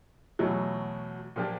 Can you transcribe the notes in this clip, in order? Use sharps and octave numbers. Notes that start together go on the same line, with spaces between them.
E2 B2 F#3 A3
A#2 F3 A#3 D4 G4